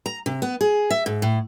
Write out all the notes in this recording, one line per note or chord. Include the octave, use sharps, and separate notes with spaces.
A#5
C3
B3
G#4
E5
G#2
A2